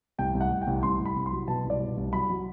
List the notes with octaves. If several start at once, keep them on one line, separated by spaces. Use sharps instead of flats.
C2 G5
C2
F#5
C2
G5
C2
C2 C6
C2
B5
C2
C6
F#3
B2 A5
C2
D5
B2
C2
F#3 B5
F#3